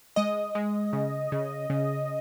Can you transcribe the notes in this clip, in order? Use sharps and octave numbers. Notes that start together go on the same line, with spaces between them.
G#3 D#5
G#3
C#3
C#3
C#3